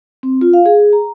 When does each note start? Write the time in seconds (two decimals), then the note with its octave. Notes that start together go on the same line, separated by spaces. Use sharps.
0.23 C4
0.41 F4
0.53 F5
0.66 G#4
0.93 A#5